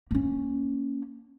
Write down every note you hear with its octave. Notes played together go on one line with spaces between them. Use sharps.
A#3 C#4